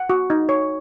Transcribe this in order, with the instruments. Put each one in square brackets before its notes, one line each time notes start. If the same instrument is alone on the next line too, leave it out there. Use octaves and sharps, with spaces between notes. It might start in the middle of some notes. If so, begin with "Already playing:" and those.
Already playing: [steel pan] F#5
F#4
D#4
C#5